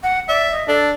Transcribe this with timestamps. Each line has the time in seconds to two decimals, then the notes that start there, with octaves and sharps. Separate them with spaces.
0.03 F#5
0.29 D5 E5
0.51 D#5
0.68 D4 A4